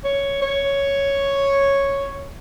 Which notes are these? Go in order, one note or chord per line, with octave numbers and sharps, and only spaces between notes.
C#5
C#5